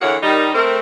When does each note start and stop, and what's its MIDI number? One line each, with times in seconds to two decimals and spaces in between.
0.02 0.16 50
0.02 0.16 52
0.02 0.16 58
0.02 0.16 68
0.02 0.16 73
0.02 0.16 78
0.22 0.51 51
0.22 0.51 55
0.22 0.51 63
0.54 0.79 57
0.54 0.79 60
0.54 0.79 70